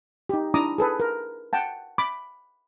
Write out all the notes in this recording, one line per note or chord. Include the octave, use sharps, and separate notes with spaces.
D#4 G4
D4 E4 A#5 D6 D#6
G#4 A4 B4
A#4
F#5 G5 A5
B5 D6